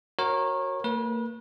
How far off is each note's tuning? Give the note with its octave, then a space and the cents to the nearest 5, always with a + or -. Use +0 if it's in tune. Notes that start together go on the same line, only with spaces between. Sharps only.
F#4 +5 A#4 +0 C#5 -30
A#3 -40 B4 -35